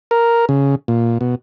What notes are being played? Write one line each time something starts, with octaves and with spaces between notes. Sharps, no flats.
A#4
C#3
A#2
B2